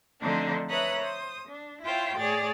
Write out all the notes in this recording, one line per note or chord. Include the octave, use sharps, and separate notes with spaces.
D3 F3 A3 C4 D4 D#4
B4 C#5 E5 A#5 D#6 F#6
C5 D#6
D4
E4 F4 C5 C#5 G5
A2 G#4 C#5 D5 A6